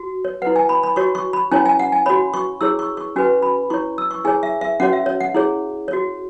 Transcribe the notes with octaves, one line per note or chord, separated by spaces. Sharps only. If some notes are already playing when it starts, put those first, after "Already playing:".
Already playing: F#4
C#5
E4 B4 F#5
G#5
B5
B5
F#4 C#5 C#6
C#6
B5
C#4 E4 C#5 G#5
G#5
F#5
G#5
F#4 C#5 B5
C#6
E4 G#4 C#5 E6
C#6
C#6
C#4 F#4 B4 G#5
B5
E4 C#5 C#6
E6
C#6
E4 G#4 C#5 G#5
E5
E5
C#4 F#4 C#5 F#5
E5
C#5
F#5
E4 G#4 C#5
C#5
F#4